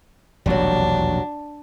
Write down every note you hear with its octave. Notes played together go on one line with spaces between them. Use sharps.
E1 A#1 D#2 F#3 G3 D4